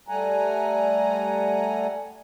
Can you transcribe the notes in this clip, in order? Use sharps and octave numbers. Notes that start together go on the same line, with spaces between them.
G3 A3 F#5 G#5 A#5